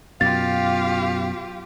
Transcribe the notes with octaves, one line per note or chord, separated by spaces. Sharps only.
F#2 B2 F4 G4 F5 A6